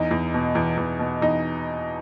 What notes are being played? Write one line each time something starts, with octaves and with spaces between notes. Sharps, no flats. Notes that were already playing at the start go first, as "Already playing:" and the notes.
Already playing: E2 D#4
E2
B2
E2
E2
B2
E2 D#4